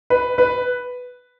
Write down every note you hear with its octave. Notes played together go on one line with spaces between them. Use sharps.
B4
B4